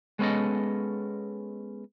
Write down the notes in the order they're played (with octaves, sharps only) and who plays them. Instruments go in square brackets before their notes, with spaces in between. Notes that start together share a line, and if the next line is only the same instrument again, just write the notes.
[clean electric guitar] G#3 B3 C#4 A4 D#5